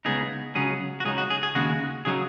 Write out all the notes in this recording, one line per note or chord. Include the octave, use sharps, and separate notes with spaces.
C#2 C#3 B3 D#4 G#4
C#2 C#3 F#3 C#4 G#4
F#4
C#2 C#3 F#3 D#4 G#4
F#4
G#4
G#4
D#2 C#3 G#3 F#4
C#3 F#3 D#4 G#4